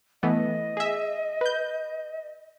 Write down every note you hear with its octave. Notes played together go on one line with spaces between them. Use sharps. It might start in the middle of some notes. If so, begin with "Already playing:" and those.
E3 A3 B3 D#5
G#4 E5
B4 G6